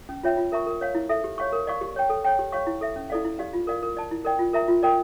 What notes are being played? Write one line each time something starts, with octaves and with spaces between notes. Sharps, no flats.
C#4
F4 C#5 E5 G5
F4
A#4 E5 A#5 C#6
A#4
C#5 F5
E4
A4 E5
G4
C#5 F5 C#6
A#4
D5 F5 C#6
G4
C#5 G5
A4
C#5 G5
G4
C#5 F5 C#6
E4
A4 E5
C#4
E4 A4 D5 F5
E4
G4 D5 F5
F4
A#4 D5 F5
A#4
D5 A5
E4
A#4 D5 G5
F4
A#4 E5 A#5
F4
A#4 D5 G5